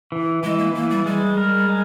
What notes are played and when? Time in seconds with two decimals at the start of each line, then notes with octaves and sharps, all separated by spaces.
0.12 E3
0.43 E3 G#3
0.58 A#3
0.74 E3 A#3
0.90 G3
1.06 G3 G#3
1.37 A#4
1.69 G#3